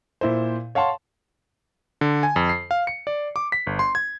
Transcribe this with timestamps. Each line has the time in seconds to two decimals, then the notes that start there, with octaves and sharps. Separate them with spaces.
0.21 A#2 E4 C5
0.75 C#5 F5 F#5 A5 C6
2.01 D3
2.23 G#5
2.36 F2
2.49 C7
2.71 F5
2.87 C#7
3.07 D5
3.36 D6
3.52 B6
3.67 G1
3.79 C6
3.95 G#6